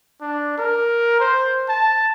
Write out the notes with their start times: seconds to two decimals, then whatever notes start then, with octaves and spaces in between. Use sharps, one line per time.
0.21 D4
0.58 A#4
1.20 C5
1.69 A5